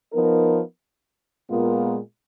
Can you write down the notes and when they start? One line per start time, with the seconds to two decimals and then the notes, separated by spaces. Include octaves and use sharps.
0.12 F3 B3 D#4 A#4
1.49 A#2 G#3 B3 F4 A#4